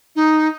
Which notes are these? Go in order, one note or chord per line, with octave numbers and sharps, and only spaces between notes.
D#4